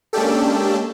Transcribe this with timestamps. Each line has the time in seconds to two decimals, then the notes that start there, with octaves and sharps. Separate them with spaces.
0.13 G#3 A#3 C#4 D4 G4 A4